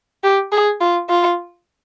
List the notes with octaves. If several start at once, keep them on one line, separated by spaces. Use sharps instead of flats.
G4
G#4
F4
F4